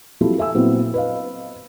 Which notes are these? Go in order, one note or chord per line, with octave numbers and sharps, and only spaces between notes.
F3 F#3 C4 E4 G4 A4
A4 E5 G#5 E6
A#2 F#3 B3 C4 E4
B4 D#5 F5